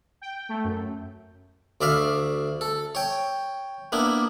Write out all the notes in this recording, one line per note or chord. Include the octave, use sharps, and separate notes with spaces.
G5
A3
F#2
D2 D5 E5 F5
A4
C#5 G5
A#3 B3 D4 E4